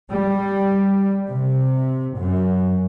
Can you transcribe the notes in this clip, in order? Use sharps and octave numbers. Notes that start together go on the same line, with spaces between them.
G3
C3
F#2